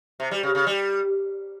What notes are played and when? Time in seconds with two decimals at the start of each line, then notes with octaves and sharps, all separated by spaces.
0.20 C3
0.31 G3
0.43 C#3
0.55 C#3
0.67 G3